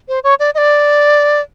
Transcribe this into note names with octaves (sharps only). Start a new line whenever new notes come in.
C5
C#5
D5
D#5
D5